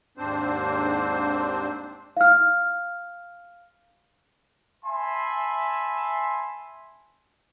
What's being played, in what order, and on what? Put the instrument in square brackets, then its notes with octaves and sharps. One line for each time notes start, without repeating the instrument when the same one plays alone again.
[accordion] D#2 G#2 C4 D4 C5
[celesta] F5 F6
[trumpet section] E5 G#5 A5 B5 C6